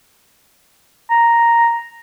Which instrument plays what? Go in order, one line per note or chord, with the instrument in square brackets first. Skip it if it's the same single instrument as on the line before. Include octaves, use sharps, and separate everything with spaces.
[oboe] A#5